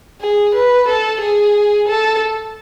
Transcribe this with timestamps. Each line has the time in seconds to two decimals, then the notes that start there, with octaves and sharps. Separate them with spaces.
0.21 G#4
0.55 B4
0.88 A4
1.21 G#4
1.88 A4